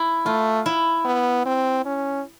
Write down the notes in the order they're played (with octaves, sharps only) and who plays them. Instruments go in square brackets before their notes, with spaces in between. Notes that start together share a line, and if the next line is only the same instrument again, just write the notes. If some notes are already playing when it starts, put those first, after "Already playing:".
Already playing: [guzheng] E4
[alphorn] A3 [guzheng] F4
[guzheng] E4
[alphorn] B3
C4
C#4